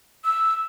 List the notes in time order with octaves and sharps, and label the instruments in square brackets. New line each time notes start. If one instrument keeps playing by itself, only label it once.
[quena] E6